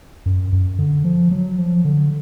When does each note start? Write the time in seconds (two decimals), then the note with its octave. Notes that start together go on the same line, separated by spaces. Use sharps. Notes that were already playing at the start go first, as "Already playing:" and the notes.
0.26 F#2
0.52 F#2
0.79 D3
1.04 F3
1.31 F#3
1.58 F3
1.85 D3